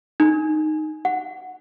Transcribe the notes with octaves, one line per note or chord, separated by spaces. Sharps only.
D#4
F#5